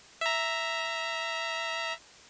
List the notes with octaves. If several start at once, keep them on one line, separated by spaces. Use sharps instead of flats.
E5 A#5